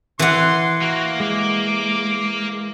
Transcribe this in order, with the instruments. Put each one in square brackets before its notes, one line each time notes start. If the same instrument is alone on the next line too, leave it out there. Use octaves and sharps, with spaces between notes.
[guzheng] E3 F#5 [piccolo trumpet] C6
[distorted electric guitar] A#3 [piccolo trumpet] F#4
[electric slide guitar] G#3 [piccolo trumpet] D6